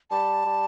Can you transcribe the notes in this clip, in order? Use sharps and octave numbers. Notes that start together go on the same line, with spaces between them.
G3 A5
G3